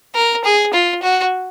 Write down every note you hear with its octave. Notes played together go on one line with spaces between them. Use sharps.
A#4
G#4
F4
F#4